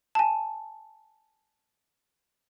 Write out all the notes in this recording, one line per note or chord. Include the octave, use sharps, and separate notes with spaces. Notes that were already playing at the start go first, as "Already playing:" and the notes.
G#5 A5